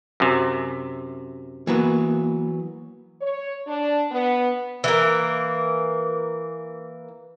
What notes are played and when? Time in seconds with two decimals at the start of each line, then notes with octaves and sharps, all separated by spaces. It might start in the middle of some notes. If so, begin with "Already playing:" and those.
0.20 F#2 C3
1.67 E3 F#3 A#3 B3
3.21 C#5
3.67 D4
4.12 B3
4.84 E3 A#3